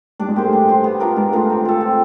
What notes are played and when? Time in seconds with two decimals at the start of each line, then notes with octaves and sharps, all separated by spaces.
0.20 G3 D4
0.28 G#3
0.36 A#3 G4 C5
0.45 A3
0.53 D4
0.69 G4 C5
0.84 B3
1.00 D4 F4 A#4
1.16 G#3 B3
1.32 A3 D4 F4 A#4
1.50 C4
1.65 F4 A4
1.81 C4